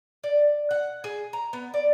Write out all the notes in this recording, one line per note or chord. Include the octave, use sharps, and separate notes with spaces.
D5
F#5
G#4
A#5
B3
D5